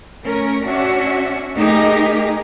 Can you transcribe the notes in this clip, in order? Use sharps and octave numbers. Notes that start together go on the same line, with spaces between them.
A3 C#4 A#4
C#4 D4 F#4 E5
A3 A#3 D#4 G4 G#4 A#4